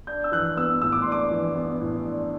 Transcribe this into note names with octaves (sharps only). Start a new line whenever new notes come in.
D4 G6
E6
E3 F#6
B3 E6
A2 E6
D6
D4 C6
D6
E3
B3
A2
D4